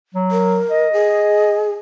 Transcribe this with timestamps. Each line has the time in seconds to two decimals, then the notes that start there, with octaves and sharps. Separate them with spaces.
0.15 F#3
0.31 A#4
0.71 D#5
0.93 G#4